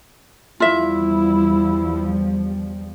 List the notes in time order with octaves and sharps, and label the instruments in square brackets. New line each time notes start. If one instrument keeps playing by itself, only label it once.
[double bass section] E2 F3 G3 [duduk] E4 [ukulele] F4 E5